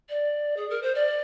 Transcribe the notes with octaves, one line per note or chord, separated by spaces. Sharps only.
D5
G#4
A#4
C5
D5